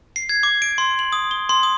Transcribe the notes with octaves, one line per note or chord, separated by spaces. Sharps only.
C7
G#6
D6
D7
C6
F#7
D#6
G7
C6
D#6